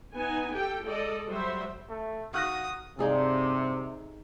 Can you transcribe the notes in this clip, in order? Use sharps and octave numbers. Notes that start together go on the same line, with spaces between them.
B3 D#4 G#5
G4 A4 G5
G#3 A4 D5 D#5
F#3 G3 C5 E5
A3
D#3 F#4 F5 C#6 D#6 F6 F#6 A#6
G2 C3 D#4 G#4 A4 D5 F5